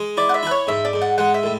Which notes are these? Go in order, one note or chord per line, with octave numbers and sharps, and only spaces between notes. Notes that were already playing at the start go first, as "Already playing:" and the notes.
Already playing: G#3
E4 D5
F#5
E5
E4 B4
C#5
G#2 E5
D5
G#2
F#5
G#3 F#5
E5
A2